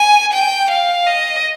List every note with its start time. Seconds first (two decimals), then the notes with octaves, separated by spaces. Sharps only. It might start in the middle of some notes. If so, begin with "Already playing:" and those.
Already playing: G#5
0.32 G5
0.70 F5
1.07 D#5